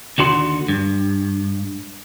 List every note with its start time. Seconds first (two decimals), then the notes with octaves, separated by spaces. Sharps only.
0.18 D#2 D3 F#4 C6
0.68 G2